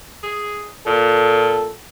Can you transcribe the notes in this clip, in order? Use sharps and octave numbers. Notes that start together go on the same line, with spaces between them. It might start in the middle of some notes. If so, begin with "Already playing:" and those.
G#4
A#2 A4